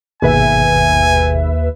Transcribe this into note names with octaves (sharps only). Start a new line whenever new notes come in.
G1 D#2 B2 G#4 B4 E5 G#5